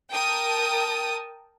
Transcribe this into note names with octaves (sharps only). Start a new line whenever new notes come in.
A#4 G5 A5 D#6